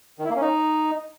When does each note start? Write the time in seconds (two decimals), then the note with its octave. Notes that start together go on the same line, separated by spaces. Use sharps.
0.19 D#3
0.25 E4
0.30 A#3
0.36 C#4
0.41 D#4